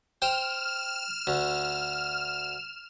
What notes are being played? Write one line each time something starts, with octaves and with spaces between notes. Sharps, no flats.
C5 G5 F6 E7
D2